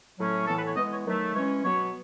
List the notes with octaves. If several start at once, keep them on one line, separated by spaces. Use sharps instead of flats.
A2 F#3 A3 C#4
A2 E3 B3 A4
B4
C#5
E3 G#3 B3 D#5
C#5
D#3 F#3 A3
E3 G#3 C#4 C#5
B2 F#3 B3 C#5